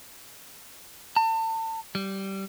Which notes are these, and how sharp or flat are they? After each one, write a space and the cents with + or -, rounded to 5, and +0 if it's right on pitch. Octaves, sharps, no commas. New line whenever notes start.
A5 +35
G3 -15